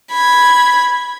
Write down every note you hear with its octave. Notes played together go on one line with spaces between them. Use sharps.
B5 G#6